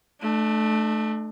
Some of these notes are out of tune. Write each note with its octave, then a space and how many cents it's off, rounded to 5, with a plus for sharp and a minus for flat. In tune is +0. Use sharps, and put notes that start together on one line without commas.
A3 -15 D4 +35